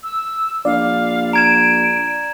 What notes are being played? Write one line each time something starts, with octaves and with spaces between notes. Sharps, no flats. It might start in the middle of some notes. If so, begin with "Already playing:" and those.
E6
A#1 D5 F5
A#5 G#6 D7 E7